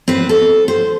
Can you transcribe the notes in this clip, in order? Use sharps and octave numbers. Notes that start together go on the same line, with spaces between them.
C4 B4
A4
C5